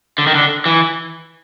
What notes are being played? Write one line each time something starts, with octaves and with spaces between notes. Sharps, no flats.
D3
D#3
D3
E3